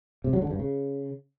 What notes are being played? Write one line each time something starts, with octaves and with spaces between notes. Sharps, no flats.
C3
F#3
D3
G2
C#3